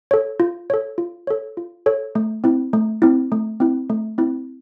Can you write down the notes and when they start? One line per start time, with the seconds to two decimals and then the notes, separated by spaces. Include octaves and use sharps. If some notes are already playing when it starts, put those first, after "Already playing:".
0.11 A4 C#5
0.40 F4
0.70 A4 C#5
0.98 F4
1.27 A4 C#5
1.57 F4
1.86 A4 C#5
2.15 A3
2.44 C4 E4
2.73 A3
3.02 C4 E4
3.32 A3
3.60 C4 E4
3.90 A3
4.18 C4 E4